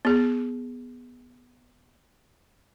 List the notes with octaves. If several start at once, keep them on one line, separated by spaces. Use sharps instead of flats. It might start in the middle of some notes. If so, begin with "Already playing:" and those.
B3 G#4